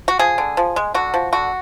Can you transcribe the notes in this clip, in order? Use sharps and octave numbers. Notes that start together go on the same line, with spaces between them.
F#4
F3 G#4
D3
F3
G#3
D3 F#4
F3
D3 F#4